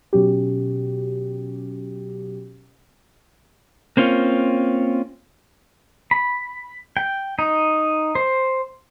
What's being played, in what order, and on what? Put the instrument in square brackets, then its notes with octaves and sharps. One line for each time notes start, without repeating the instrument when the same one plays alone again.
[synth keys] B2 F#3 C#4 F#4 G4
[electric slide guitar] A#3 C4 C#4 F4
[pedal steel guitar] B5
G5
D#4
C5